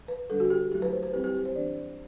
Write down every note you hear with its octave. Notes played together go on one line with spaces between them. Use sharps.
B4
D3 G3 D4 A4
F#4
G4
F#3 A3 E4 G4
B4
C5
B4
G3 C4 E4 G4
G4
G4
C5
E3 B3 D4 D5